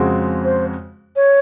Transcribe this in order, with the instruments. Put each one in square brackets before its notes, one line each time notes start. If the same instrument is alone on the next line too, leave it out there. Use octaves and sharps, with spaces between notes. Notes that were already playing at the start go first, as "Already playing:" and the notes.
Already playing: [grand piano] F2 C#3 G#3 C4 F#4
[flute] C5
C#5